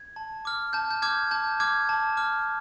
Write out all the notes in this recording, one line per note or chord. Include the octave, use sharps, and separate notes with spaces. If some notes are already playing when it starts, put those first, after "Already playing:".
Already playing: G#6
A5
D6 F6
A5 G6
G6
D6 F6 G#6
A5 G6
D6 F6 G#6
A5
D6 F6